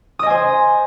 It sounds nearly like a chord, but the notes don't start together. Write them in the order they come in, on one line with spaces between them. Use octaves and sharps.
D#6 D#5 G#5 C5